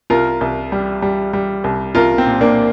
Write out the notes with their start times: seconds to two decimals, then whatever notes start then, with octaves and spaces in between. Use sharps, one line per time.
0.10 C2 F4 A#4
0.41 C2
0.72 G3
1.02 G3
1.33 G3
1.64 C2
1.95 C2 F4 A#4
2.18 C4
2.26 A#2
2.41 A#3 D4